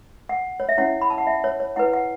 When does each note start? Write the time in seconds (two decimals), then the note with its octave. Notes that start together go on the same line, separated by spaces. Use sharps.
0.29 F#5
0.60 C#5
0.69 E5
0.78 C#4 E4 C#5 F#5
1.01 B5
1.10 A5
1.18 F#5
1.27 E5
1.44 C#5
1.60 C#5
1.76 E4 B4 F#5
1.93 F#5